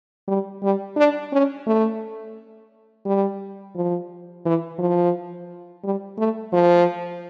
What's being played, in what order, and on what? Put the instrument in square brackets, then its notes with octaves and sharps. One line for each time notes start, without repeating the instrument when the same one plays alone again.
[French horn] G3
G3
D4
C#4
A3
G3
F3
E3
F3
G3
A3
F3